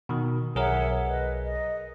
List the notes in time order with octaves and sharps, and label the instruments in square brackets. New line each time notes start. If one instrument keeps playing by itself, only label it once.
[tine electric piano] B2 D#3
[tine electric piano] B1 G#4 A#4 [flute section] C#5 E5 F#5
[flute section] B4 D#5
D#5